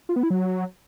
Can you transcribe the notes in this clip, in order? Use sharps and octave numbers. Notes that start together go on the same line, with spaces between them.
F4
B3
E4
F#3